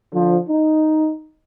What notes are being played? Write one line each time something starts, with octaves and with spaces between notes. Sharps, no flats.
D3 F3
D#4